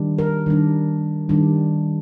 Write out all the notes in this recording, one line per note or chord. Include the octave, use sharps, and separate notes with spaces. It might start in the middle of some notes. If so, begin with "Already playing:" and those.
Already playing: D#3 G3 D4
A#4
D#3 G3 D4
D#3 G3 D4